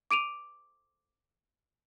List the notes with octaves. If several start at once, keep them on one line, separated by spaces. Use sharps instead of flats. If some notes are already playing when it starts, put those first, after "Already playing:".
D6 D7 D#7 F7